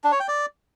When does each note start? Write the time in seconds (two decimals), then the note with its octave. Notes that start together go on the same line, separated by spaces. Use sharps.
0.04 D4
0.12 C#5
0.20 G5
0.28 D5